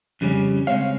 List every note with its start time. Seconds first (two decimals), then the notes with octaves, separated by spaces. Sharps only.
0.21 F2 C#3 G3 C#4
0.67 C#3 G#3 C4 C#5 F5